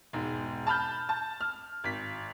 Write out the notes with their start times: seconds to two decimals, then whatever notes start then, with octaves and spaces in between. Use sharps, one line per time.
0.13 E1 G#2
0.67 A5 B5 F6 G6
1.09 A5
1.41 F6
1.84 G#1 B6